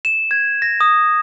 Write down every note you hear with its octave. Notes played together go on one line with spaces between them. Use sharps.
E7
G#6
A#6
D#6